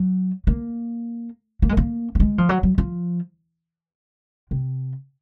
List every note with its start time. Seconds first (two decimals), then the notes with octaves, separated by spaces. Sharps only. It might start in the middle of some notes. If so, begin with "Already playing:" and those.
Already playing: F#3
0.47 A#3
1.62 A#3
1.69 G#3
1.77 A#3
2.15 A#3
2.20 G#3
2.38 F3
2.49 F#3
2.63 F#3
2.78 F3
4.51 C3